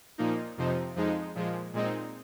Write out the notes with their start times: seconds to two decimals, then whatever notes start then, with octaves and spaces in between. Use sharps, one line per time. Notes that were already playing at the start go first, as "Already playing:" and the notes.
0.18 A#2 F3 A#3 D#4
0.57 F2 C3 F3 C4 D#4
0.96 F2 F3 G#3 D#4
1.35 A#2 F3 G#3
1.73 A#2 G#3 C4 D#4